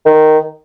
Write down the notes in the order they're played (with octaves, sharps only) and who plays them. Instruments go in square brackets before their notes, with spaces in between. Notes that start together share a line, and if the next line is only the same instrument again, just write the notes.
[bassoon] D#3